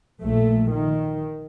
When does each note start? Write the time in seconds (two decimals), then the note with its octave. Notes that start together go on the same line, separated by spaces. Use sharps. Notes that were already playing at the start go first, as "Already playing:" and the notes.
0.23 A#1 A#2 A3
0.71 D#3